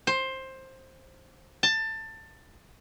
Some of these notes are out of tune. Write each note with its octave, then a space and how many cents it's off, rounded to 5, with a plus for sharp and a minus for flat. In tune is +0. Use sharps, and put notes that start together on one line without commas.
C5 +15
A5 +20